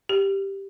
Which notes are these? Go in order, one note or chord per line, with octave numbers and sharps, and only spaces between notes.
G4